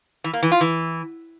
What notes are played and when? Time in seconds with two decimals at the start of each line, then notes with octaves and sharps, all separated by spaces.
0.24 E3
0.33 A#3
0.43 E3
0.52 F4
0.61 E3